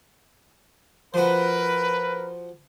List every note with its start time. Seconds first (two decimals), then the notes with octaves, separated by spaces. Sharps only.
1.14 F3 F#4 A#4 B4